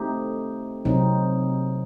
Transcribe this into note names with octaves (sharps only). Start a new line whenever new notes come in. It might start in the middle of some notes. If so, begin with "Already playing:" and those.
Already playing: A3 C4 D#4 G4
C3 F#3 C4 D#4